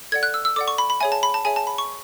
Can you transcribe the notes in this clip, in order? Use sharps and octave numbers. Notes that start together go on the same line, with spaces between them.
A4 D5 F#5 G#6
F#6
E6
E6
A4 D5 F#5 D6
C#6
B5
B5
G#4 C#5 E5 G#5
A5
B5
A5
G#4 C#5 E5 G#5
A5
B5
C#6